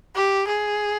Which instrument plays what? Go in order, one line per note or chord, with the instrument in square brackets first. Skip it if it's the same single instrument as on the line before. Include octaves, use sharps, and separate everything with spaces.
[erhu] G4
G#4